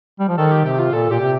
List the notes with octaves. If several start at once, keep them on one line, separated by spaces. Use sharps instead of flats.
G3
F3
D#3 A4
G4
C3 G4
F4
A#2 A4
A#2 G4
C3